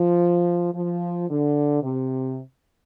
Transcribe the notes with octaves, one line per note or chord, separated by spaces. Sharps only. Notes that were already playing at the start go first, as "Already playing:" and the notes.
Already playing: F3
F3
D3
C3